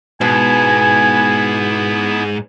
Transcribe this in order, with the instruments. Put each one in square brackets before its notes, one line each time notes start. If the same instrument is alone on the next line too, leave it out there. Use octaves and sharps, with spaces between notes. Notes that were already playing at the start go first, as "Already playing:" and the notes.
[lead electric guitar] G#2 [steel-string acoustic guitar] B2 [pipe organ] B3 E4 [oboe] G#5